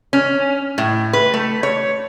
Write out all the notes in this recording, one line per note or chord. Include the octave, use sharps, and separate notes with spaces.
C#4
A2
B4
A3
C#5